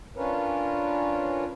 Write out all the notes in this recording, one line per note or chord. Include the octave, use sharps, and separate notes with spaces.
C#4 D4 F4 A#4 B4 C#5